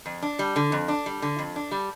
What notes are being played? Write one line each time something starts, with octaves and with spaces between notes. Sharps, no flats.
F2
D4
G3
D3
F2
D4
G3
D3
F2
D4
G3